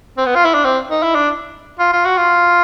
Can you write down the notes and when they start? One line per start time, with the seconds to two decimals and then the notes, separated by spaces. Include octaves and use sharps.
0.17 C4
0.26 B3
0.35 F4
0.45 E4
0.54 D4
0.65 C4
0.90 D#4
1.03 E4
1.15 D4
1.79 F4
1.93 F4
2.05 F#4
2.17 F4